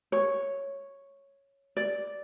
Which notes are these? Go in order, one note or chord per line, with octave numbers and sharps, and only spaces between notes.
C#5
D5